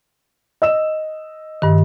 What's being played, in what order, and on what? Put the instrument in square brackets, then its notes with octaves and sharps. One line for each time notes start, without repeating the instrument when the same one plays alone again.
[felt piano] D#5 E6 E7
[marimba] G2 D#3